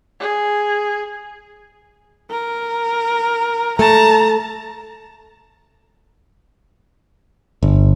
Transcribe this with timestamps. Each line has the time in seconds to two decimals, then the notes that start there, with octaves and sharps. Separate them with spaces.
0.20 G#4
2.31 A#4
3.79 A3 A5 A#5
7.63 G1